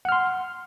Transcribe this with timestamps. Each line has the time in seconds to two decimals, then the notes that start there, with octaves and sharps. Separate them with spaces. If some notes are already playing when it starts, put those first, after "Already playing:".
0.05 F#5
0.09 F6
0.12 C6